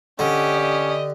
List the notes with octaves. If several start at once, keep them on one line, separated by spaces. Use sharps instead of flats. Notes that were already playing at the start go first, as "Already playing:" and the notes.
D3 C#4 G4 D#5
D#5